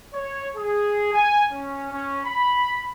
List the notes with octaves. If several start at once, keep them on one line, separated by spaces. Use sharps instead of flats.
C#5
G#4
G#5
C#4
C#4
B5